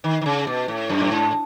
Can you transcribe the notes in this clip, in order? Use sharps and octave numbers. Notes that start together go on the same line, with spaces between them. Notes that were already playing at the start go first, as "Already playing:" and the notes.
D#3
D#3
C#3
B2
A2
F#2
A2
G#2